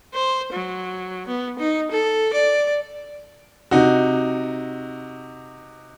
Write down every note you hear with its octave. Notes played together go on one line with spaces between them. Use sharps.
C5
F#3
B3
D#4
A4
D5
C3 D#4 F#4